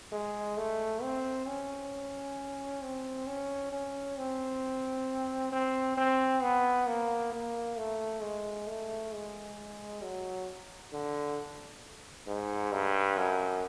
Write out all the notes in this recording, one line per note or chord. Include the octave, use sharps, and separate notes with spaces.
G#3
A3
C4
C#4
C4
C#4
C#4
C4
C4
C4
B3
A#3
A#3
A3
G#3
A3
G#3
F#3
D3
G#2
G2
F#2